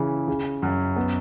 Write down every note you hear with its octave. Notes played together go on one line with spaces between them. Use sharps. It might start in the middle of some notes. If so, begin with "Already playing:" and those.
Already playing: C#3 E3
C#3
F#2
B3